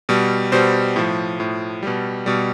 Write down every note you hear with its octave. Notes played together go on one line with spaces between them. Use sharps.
B2 G3
B2 G3 C5
A2 F3
A2 F3
B2 G3
B2 G3